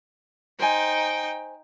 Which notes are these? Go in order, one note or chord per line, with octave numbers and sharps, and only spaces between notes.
D#4 C5 G5 G#5